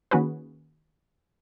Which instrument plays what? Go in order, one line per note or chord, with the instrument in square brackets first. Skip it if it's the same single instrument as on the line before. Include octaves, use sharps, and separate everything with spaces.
[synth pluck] D#3 A#3 C#4 F#4 G#4 B4